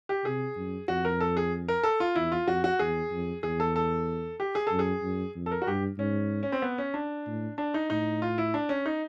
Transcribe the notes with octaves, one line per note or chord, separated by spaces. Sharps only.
G4
C3 G#4
F#2
F2 F#4
A#4
A4
G#4
A#4
A4
F4
E2 E4
F4
F2 F#4
F#4
E2 G#4
F2
E2 G#4
A4
A4
G4
G#4
F#2 A4
G#4
F#2
F2
A4
A#4
F#4
G2 G4
G#2 C#4
C#4
C4
B3
C#4
D4
A2
D4
D#4
A2 D#4
F4
E4
D4
C#4
D#4